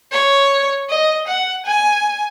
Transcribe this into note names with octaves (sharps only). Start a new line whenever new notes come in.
C#5
D#5
F#5
G#5